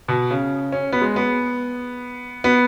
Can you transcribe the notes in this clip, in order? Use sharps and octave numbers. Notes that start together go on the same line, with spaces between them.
B2
C#3
C#4
B3
G#3
B3
B3